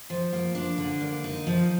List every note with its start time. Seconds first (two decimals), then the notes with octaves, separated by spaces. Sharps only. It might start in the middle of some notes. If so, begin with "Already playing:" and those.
0.10 F3
0.33 A#3
0.55 D4
0.78 D3
1.00 A#3
1.24 D#4
1.47 F3